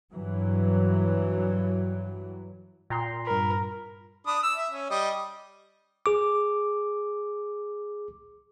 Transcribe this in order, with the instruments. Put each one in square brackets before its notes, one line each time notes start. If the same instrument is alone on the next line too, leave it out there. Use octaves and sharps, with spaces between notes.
[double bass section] G2 E3 F#3
[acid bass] A#2 [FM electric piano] G5 A#5 C6
[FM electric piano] G2 B5 [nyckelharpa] A#4
[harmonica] D4 B5 D#6
E6
E5
C#4
G3 D#5
[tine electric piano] G#4 D6